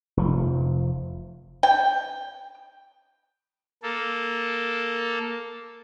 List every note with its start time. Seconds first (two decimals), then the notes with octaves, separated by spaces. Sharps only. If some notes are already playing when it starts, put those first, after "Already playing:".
0.17 F1 F3
1.63 G5
3.83 A#3 A4